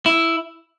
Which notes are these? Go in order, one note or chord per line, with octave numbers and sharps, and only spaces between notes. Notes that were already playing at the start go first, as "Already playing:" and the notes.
E4